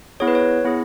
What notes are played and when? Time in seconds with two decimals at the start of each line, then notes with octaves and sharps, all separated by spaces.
0.20 B3 E4 G#4 C#5
0.28 B4
0.35 C#5
0.65 B3 E4 G#4